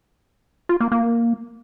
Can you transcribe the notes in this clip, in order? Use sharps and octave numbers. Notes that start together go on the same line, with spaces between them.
F4
A#3
A#3